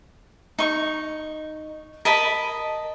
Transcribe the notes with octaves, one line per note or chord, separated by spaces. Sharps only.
D#4 C#6
A#4 D#5 A5 B5